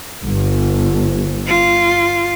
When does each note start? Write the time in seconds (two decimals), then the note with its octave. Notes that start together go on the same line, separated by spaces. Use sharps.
0.23 G1
1.47 F4